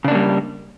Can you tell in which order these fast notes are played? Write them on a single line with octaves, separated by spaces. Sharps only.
C#3 D4 A#3 G3